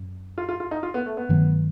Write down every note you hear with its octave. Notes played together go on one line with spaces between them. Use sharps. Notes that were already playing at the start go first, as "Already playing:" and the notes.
Already playing: F#2
F4
F4
F4
D#4
F4
B3
A3
B3
G2 D#3 F#3 A3